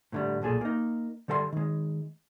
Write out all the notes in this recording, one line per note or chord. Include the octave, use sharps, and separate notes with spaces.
A2 D3 G3
B1 A#2 G#4 A4
A#3 D#4
D3 G3 A4 F#5 C6
D#3 G#3